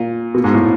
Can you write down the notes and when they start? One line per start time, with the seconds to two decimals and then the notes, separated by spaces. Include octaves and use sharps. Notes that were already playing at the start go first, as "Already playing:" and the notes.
Already playing: A#2
0.34 B2
0.44 G#2
0.54 A2